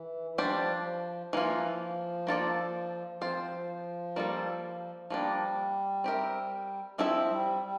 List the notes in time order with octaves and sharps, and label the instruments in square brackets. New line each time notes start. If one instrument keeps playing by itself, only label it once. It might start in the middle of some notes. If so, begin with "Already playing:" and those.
Already playing: [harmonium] E3
E3
[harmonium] F3 [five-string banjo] G3 D4 G4 C5
[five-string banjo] E3 A#3 F4 [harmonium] F3
[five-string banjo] A#3 D4 F4 A4 D5
[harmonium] F3 [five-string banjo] C4 F4 C5
[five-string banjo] G3 A#3 F4 A4
[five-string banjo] F3 A#3 D4 [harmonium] G3
[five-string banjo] C4 G4 A#4 E5
F3 C4 E4 A4 E5
[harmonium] G3
G3